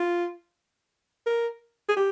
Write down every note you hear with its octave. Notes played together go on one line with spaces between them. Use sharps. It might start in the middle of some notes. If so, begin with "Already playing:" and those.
Already playing: F4
A#4
G#4
G4